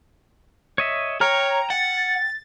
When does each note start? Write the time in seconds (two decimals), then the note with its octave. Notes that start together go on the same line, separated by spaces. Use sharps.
0.78 C#5 D#5 E5
1.21 C#5 G5 A#5 F6
1.70 F#5 A6